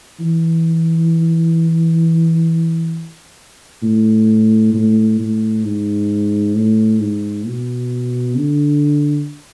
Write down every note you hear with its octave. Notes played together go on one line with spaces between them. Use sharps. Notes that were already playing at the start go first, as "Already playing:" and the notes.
E3
A2
A2
A2
G#2
A2
G#2
B2
D3